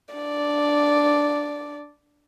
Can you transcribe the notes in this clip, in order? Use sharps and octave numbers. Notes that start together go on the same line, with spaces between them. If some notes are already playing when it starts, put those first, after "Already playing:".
D4 D5